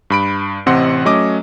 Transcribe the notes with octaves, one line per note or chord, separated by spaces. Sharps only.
G2 B5 D7
A1 C3 C4 D#5 F#5 C6
F#3 A3 C#4 D#5 D6